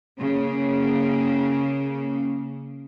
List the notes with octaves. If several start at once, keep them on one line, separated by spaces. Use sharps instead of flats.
C#3 A#3